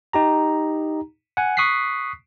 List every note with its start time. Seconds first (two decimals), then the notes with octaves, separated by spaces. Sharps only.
0.13 D#4 G4 A#5
1.37 F#5 G#5
1.57 C#6 D#6 F#6 B6 C7